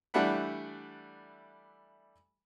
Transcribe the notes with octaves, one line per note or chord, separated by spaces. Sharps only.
E3 G3 A3 D4 F#5 B5